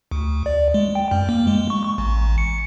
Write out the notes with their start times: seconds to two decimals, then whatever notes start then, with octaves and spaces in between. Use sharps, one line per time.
0.11 D2
0.46 D5
0.74 G#3
0.95 G5
1.11 F#2
1.29 A#3
1.47 G#3
1.70 C#6
1.84 C#6
1.98 A1
2.38 C#7